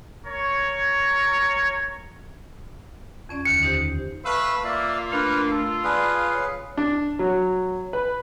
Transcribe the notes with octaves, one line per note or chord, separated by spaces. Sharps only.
A#4 C#5
F2 C#4 D5
D#2 D3 D#3 C#7
D#4 G4 C5
A3 B4 F5 E6
A#3 F4 D5 E5 F5
A3 D4 A#4 B4 F5
F4 A4
G#4 B4 D5 F5 A5
C#5
D4
F#3
B4